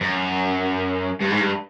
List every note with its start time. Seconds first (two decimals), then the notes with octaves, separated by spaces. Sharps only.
0.01 F#2
1.21 G2
1.30 G#2
1.41 G2